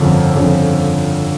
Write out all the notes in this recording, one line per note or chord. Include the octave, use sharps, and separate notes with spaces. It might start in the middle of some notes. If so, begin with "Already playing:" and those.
Already playing: G1 F2 C#3 F3
G1 F2 C#3 F3